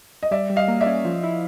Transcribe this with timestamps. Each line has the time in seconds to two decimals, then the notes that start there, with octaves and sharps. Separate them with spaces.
0.23 D#5
0.31 G3 D5 E5
0.50 G3
0.56 D#5 F5
0.68 A#3
0.81 D5 E5
0.86 C#4
1.05 F3
1.24 E4